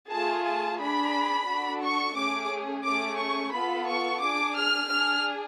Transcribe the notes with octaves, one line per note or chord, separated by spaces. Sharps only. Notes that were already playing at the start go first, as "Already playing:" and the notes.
A3 F4 G#4 A5
A5
D4 G#4 B5
D4 F#4 A4
C#6
A3 C#4 G#4 D6
A3 C#4 G#4 D6
C#6
B3 F4 A4 B5
C#6
D4 G#4 D6
F6
D4 G#4 F6